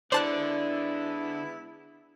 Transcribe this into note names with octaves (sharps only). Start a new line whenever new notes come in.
D3 G#3 B3 E4 C5 D5 A5 F#6